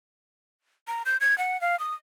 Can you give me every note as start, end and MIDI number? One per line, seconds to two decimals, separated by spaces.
0.88 1.02 82
1.06 1.17 91
1.21 1.37 92
1.38 1.60 78
1.61 1.78 77
1.80 1.94 87